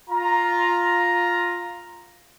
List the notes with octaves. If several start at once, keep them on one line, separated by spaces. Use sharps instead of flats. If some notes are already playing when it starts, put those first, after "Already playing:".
F4 A#5